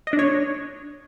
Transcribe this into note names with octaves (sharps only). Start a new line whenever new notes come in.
D#5
D4
C#5